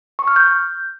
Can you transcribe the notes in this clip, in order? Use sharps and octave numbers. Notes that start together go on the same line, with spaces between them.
C#6
F6
G6